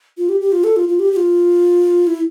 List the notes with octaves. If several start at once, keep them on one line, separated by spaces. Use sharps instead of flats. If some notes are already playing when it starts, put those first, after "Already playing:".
F4
G4
G4
F4
A4
F4
F4
G4
G4
F4
E4